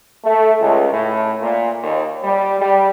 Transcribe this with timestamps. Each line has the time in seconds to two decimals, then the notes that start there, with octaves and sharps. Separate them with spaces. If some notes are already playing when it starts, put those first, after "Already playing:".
0.24 A3
0.60 C#2
0.90 A2
1.40 A#2
1.83 D#2
2.21 G3
2.59 G3